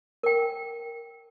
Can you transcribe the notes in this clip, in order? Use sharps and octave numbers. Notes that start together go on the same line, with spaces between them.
A#4 G5